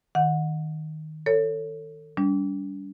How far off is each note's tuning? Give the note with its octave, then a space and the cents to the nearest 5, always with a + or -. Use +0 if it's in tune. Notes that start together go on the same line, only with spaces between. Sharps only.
D#3 +0 F#5 -25
A4 +25 C#5 +0
G3 +0 D4 -45